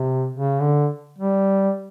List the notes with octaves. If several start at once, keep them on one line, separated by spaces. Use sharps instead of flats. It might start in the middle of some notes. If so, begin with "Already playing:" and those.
Already playing: C3
C#3
D3
G3